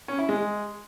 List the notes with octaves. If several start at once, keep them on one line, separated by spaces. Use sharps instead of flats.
C#4
E4
G#3